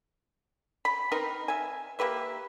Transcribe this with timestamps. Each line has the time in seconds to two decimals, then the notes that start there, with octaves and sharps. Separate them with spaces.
0.85 B5
1.11 C4 D#4 A#4 B4
1.48 E5 G#5
1.99 A#3 G4 B4 E5